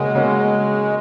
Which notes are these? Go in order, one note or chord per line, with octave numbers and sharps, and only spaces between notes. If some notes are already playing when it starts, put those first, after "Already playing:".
Already playing: C#3 G#3 A#3 C#4 F#4
C#3 A#3 C#4 F#4